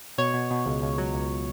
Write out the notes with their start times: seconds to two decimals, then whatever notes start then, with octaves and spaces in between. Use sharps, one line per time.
0.18 B2 C#5
0.34 B2
0.51 B2
0.66 C#2
0.82 C#2
0.98 F#3
1.14 C#2